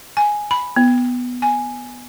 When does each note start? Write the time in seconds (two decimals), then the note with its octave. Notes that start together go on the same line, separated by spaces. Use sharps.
0.17 G#5
0.51 B5
0.76 B3
1.42 G#5